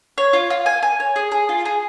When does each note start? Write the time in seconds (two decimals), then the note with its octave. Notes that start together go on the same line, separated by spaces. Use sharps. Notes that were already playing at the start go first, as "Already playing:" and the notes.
0.18 C#5
0.33 F4
0.50 F4
0.66 G#5
0.82 G#5
1.00 C#5
1.16 G#4
1.32 G#4
1.49 F4
1.65 G#4